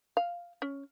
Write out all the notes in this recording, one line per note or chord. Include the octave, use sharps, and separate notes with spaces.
F5
C#4